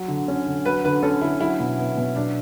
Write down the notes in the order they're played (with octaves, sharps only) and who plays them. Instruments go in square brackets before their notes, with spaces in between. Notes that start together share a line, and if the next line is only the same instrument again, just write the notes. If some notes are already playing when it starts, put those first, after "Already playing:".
Already playing: [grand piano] F#3
D3
C#4
D3
[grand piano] F#3 [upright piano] B4
[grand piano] D3 [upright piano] B4
[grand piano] C#4 [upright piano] A4
[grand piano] D3 [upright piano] E4
[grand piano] F#3 [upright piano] E4
[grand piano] B2
B3
B2
[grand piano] F#3 [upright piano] D4